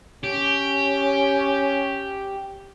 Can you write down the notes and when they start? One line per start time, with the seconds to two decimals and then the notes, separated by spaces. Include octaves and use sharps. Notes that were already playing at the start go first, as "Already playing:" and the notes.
0.24 C#4 G4